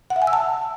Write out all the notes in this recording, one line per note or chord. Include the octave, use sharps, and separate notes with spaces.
F#5
E5
G#5
E6
A5